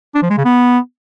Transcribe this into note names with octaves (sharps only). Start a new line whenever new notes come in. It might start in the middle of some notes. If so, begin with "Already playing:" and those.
D4
F3
G#3
C#3
B3